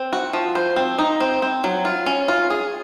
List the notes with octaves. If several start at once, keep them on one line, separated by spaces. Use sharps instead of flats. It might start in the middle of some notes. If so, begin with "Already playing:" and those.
Already playing: C4
F#4
F3
C5
C4
D#4
C4
C4
F#3
F4
C#4
F4
G#4